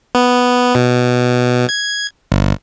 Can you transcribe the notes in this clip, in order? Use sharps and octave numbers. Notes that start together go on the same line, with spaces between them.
B3
B2
G#6
G1